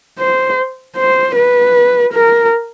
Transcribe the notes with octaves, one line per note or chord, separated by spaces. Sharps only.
C5
C5
B4
A#4